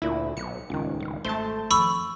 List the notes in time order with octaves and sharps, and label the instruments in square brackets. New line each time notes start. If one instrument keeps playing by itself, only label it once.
[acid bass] D2 [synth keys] A#2 E4
[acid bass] B1 [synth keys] C#7
[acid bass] D#1 [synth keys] C#2 D#3
[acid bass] D1 [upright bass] G#2
[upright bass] G#1 [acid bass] A3 [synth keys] C5 A5 [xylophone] G7
[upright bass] F2 D#3 [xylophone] B5 C#6 E6